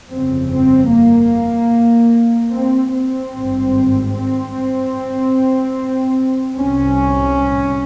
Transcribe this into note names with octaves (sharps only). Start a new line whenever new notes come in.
G1 F2 C#3 C4
C4
A#3
C4
C4
G#1 G2
C4
C2 C3 C#4